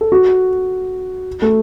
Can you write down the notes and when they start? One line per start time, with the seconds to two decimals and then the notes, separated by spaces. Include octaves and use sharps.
0.01 A4
0.12 F#4
1.42 A3